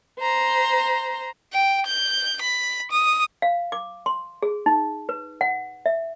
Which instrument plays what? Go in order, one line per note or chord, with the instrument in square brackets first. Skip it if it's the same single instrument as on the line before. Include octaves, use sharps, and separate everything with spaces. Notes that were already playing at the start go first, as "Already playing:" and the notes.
[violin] C5 A#5
G5
G6
B5
D#6
[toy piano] F5
D6
C6
G#4
D#4
B4
F#5
E5